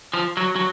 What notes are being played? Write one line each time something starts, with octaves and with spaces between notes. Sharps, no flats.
F3
F#3
F#3